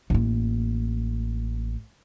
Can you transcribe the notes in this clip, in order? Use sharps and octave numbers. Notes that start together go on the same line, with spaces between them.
A1 A#3